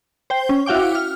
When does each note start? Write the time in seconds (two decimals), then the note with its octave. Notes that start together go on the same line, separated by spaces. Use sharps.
0.30 C5 G5
0.49 C#4
0.66 E4 F#4 F5 G5 D6
0.95 F6